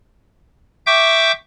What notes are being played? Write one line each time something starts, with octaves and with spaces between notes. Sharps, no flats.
E5 G5 C#6 D6 G6